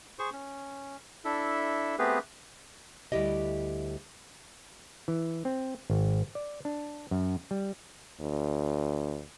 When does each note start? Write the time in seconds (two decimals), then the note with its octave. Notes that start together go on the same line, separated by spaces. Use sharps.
0.19 G#4 C5 C#6
0.33 C#4
1.25 D4 E4 A4 E5
1.99 A3 B3 C4 G4 G#4 B4
3.12 D2 G3 E4 G4 D#5
5.08 E3
5.45 C4
5.90 G#1
6.35 D5
6.65 D4
7.11 F#2
7.51 G3
8.20 D2